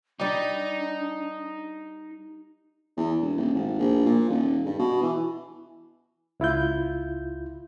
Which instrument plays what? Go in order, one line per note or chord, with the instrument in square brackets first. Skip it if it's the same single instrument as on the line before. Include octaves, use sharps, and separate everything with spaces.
[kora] G3 G4 [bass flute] D4 [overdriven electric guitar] D#4
[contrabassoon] E2
E1
D#1
G#1
A#1
A#2
D#1
G2
B2
E3
[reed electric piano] C#2 E4 F4 G6